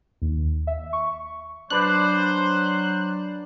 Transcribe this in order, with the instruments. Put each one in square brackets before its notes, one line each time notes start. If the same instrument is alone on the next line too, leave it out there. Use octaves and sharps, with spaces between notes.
[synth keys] D#2
E5
C#6
[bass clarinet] F#3 [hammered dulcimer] D4 B4 D5 [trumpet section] C5 [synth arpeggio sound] F#6